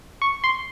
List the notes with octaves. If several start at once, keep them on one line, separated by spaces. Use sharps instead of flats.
C#6
C6